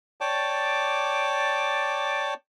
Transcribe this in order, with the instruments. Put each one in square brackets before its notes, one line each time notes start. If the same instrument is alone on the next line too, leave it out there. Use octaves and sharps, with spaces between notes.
[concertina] C#5 D5 G5 A5 D6